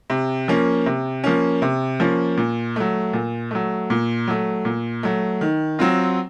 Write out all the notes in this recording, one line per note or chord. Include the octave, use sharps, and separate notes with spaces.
C3
F3 A#3 C#4
C3
F3 A#3 C#4
C3
F3 A#3 C#4
A#2
F#3 A3
A#2
F#3 A3
A#2
F#3 A3
A#2
F#3 A3
D#3
F#3 C4 F4